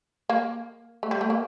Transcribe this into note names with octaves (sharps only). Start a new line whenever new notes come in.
A#3
A3
G3
A3
A#3